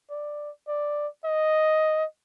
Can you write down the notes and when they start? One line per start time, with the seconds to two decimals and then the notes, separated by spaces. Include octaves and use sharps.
0.11 D5
0.68 D5
1.25 D#5